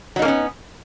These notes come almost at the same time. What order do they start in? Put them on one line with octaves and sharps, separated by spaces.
F#3 D#4 A#3 C#4 B3